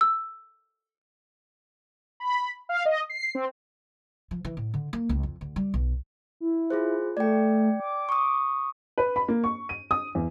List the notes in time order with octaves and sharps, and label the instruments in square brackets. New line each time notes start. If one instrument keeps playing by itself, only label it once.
[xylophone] E6
[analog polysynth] B5
F5
D#5
C7
C4
[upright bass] F3
E3
A2
D3
A#3
C#2
F2
D2
G3
B1
[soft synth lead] E4
[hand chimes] F4 G#4 C5
[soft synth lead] A3 [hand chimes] D5 G5
[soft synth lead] D6
[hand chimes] C#6 D#6
[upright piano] B4
B5
A#3
C#6
D#7
D#6
E2